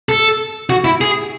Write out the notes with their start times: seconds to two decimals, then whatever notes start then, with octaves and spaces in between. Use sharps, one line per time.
0.09 A4
0.70 F#4
0.84 E4
1.01 G#4